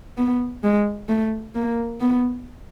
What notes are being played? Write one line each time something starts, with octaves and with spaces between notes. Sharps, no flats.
B3
G#3
A3
A#3
B3